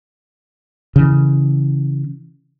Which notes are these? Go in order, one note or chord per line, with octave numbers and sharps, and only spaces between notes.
C#3 E3